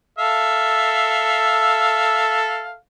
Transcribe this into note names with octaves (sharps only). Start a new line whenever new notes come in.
A4 E5 F5